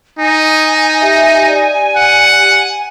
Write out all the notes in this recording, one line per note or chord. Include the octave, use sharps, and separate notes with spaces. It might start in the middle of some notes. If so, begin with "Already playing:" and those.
D#4 G#5
G4 E5
G4 D5
F#5